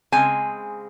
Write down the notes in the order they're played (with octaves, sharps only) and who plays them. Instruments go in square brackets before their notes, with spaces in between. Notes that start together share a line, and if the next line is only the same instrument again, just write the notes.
[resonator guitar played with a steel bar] C#3 G#3 C4 G#5